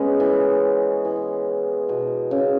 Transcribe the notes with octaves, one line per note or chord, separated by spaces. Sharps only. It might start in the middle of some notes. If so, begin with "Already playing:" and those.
Already playing: G#3 B3 C#4
E3
E3
B2
C#3